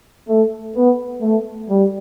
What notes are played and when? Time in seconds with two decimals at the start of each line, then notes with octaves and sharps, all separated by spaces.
0.28 A3
0.76 B3
1.22 A3
1.69 G3